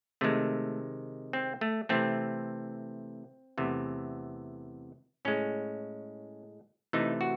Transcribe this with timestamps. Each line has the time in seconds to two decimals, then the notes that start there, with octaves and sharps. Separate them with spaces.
0.21 C3 D#3 G#3 A3
1.33 C4
1.61 A3
1.89 C3 E3 A3 C4
3.58 E2 C3 E3 A3
5.25 A2 G#3 C#4
6.93 C3 E3 A3 D#4
7.21 F#4